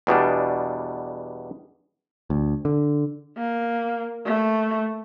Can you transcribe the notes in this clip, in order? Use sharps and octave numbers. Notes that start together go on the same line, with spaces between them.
E2 B2 G3 D4
D2
D3
A#3
A3